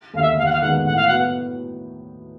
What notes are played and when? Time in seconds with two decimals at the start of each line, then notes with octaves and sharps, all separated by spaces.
0.14 D#2 D3 F5
0.22 E5
0.38 D#2 F5
0.46 F#5
0.52 F5
0.61 D#3 G#3 B3 F#5
0.85 A2 F#5
0.96 F5
1.07 F#3 B3 F#5